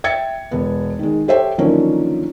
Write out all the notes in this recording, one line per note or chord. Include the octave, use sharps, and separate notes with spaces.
E5 G5 G#6 A6 C#7
E1 B3
D#3 G#3
G4 A4 C5 C#5 E5 G5
D3 D#3 F3 F#3 A#3 C#4